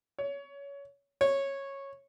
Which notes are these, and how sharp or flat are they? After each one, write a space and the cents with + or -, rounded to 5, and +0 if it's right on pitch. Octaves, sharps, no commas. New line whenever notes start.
C#5 +20
C#5 -10